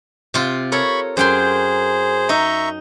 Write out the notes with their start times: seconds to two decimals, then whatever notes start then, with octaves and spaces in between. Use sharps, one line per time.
0.34 C3 F4
0.72 A4 A#4 C#5 B5 C#6
1.17 F#2 G#4 C5 G5 C6
2.29 D#4 E5 A#5 C#6